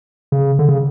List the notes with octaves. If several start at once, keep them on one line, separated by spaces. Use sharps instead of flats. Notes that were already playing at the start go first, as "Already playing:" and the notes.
C#3
D3
C#3